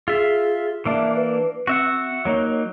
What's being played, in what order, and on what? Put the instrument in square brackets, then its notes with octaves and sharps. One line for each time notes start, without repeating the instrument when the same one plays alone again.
[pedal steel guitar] F4 E5 [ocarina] G#4
[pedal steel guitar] E3 A#3 D4 [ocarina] E5
[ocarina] B4
[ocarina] C4 [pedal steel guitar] F#4 E5 F#5
[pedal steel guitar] F#3 A#3 D#4 [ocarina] C#5